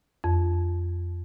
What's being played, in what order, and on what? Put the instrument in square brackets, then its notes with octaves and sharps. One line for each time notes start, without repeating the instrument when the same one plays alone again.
[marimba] F2